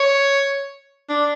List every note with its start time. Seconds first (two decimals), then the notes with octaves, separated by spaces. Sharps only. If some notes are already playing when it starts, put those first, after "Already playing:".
Already playing: C#5
1.09 D4